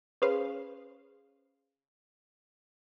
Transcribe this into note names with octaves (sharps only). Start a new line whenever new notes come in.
C#4 G#4 B4 C5 F5